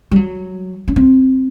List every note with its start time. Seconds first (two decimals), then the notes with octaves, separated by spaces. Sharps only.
0.11 G3
0.16 F#3
0.88 C#4
0.96 C4